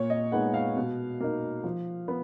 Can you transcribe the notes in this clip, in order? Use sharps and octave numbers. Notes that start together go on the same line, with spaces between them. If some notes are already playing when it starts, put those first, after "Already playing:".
Already playing: A#2 C#5
D#5
G#3 B3 D#4 F#5
F5
B2
A#3 D#4
F3
B3